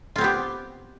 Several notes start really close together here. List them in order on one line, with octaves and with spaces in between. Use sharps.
F4 C4 B3 G4